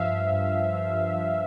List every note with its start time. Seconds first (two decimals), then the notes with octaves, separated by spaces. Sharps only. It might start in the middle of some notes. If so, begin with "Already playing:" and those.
Already playing: G2 F3 E5 F5
0.11 G2
0.32 G2
0.53 F3
0.73 F3
0.94 G2
1.15 F3